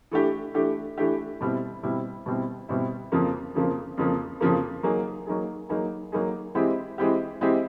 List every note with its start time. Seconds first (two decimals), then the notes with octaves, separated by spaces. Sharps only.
0.11 E3 A3 D4 G4
0.54 E3 A3 D4 G4
0.98 E3 A3 D4 G4
1.41 B2 G3 C4 E4
1.83 B2 G3 C4 E4
2.26 B2 G3 C4 E4
2.69 B2 G3 C4 E4
3.12 F2 C#3 F3 A#3
3.55 F2 C#3 F3 A#3
3.98 F2 C#3 F3 A#3
4.41 F2 C#3 F3 A#3
4.83 F#3 A#3 D#4 G#4
5.27 F#3 A#3 D#4 G#4
5.69 F#3 A#3 D#4 G#4
6.12 F#3 A#3 D#4 G#4
6.55 E3 G#3 C4 E4 G4
6.98 E3 G#3 C4 E4 G4
7.41 E3 G#3 C4 E4 G4